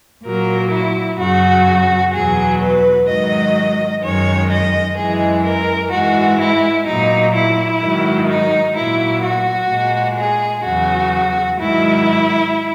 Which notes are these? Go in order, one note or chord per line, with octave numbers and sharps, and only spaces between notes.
A#2 F#3 A#4
E4
F#2 C#3 F#3 F#4
E2 B2 F#3 G#4
B4
G#2 D#3 F#3 D#5
F#2 D#3 G#3 C#5
D#5
F#2 E3 G#3 G#4
A#4
G#2 E3 G#3 F#4
E4
A#2 F#3 D#4
E4
G#2 D#3 F#3
D#4
A#2 F#3 E4
F#4
A#2 G#3
G#4
E2 C#3 F#3 F#4
G#2 D#3 F#3 E4